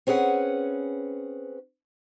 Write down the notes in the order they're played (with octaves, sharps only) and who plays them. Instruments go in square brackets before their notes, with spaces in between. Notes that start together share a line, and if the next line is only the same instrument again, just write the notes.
[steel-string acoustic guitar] C4 C#4 G#4 B4 F#5